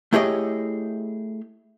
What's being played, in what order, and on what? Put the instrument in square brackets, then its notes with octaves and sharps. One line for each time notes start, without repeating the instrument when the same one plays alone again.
[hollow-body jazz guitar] A3 E4 G4 G#4 C#5 D#5